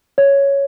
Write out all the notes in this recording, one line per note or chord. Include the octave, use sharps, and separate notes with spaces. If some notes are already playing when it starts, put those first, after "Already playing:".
C#5